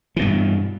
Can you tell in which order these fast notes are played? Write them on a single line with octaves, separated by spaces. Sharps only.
E3 B2 G2